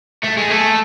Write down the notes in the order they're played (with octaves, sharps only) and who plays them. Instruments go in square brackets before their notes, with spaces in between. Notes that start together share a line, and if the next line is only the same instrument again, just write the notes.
[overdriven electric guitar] A3
G#3
A3